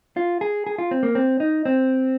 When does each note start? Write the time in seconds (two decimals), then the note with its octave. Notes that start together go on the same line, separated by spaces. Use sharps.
0.17 F4
0.41 G#4
0.67 G#4
0.78 F4
0.91 C4
1.03 A#3
1.15 C4
1.40 D#4
1.65 C4